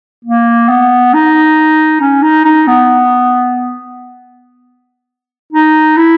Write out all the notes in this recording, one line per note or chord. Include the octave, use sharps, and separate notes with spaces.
A#3
B3
D#4
C#4
D#4
D#4
B3
D#4
E4